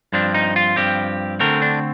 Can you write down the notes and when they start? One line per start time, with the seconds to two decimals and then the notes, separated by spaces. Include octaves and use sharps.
0.13 G2 F3 C4 D4
0.34 D#4
0.56 F4
0.76 G2 F3 C4 G4
1.40 D3 A3 C4 A#4
1.62 D4